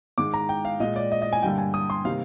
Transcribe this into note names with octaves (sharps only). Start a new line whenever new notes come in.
G#2 D#3 G#3 D6
A#5
G5
F5
A#2 G#3 D#5
D5
D#5
D#5
G#5
G2 D3 G3 A#3 G5
G#5
D#6
C6
C3 D#3 G3 A#3 F5